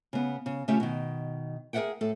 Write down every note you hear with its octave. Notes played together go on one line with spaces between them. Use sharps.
C#3 B3
C#3
C#3 A3 C#4 F4 G4 E5
B2 D#3
G#4 A#4 D5 E5 F#5 G5
A2 A4